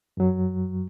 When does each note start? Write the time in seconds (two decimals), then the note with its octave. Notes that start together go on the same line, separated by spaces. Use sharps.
0.17 F#2 F#3